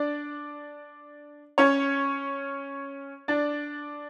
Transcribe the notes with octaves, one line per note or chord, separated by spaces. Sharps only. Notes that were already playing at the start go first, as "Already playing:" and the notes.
Already playing: D4 D5
C#4 C#5
D4 D5